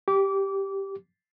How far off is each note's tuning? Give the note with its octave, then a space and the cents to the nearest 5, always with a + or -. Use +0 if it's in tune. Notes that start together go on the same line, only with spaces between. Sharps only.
G4 +0 D6 -25